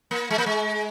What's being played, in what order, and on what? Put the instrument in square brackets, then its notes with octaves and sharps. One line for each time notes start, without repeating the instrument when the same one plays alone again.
[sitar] A#3
G#3
A#3
G#3